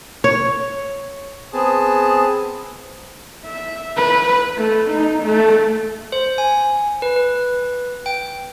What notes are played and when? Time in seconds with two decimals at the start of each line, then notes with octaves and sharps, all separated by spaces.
0.24 C#5
1.53 B3 C4 G#4 A5
3.46 E5
3.97 B4
4.57 A3
4.91 D#4
5.23 A3
6.12 C5
6.38 G#5
7.02 B4
7.16 B4
8.06 G5